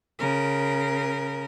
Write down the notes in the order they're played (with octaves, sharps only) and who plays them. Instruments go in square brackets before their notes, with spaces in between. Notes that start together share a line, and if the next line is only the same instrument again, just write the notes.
[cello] C#3 A#4